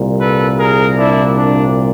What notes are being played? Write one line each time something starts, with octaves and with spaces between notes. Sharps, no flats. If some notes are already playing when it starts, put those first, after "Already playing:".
Already playing: C2 A#2 G3
A4 B4
G#4 A#4
D4 E4
D4